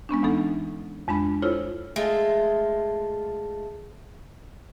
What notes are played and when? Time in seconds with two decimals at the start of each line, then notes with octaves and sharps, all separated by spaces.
0.09 G#3 B3 C#4 D4
0.23 D2 E3 B3 D#4 A4
1.08 F2 G#3 D4 B5
1.42 E4 F4 A4 C5 C#5
1.96 G#3 A3 F4